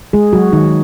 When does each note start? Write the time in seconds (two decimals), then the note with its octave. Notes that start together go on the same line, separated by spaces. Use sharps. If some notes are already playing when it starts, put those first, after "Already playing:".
0.13 G#3 G#4
0.33 F#3 F#4
0.53 D#3 D#4